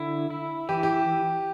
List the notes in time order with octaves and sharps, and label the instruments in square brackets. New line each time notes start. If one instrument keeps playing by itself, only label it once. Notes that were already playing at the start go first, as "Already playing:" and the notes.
Already playing: [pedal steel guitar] D3 E4
E4
[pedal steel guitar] E3 [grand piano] G4
[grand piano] G4